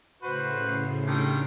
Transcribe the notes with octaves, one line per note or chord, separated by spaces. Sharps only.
A2 C#3 F#4 B4 C5 C7
D3 D#3 G3